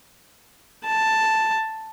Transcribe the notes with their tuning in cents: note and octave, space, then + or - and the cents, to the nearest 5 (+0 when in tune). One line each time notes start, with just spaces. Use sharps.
A5 +5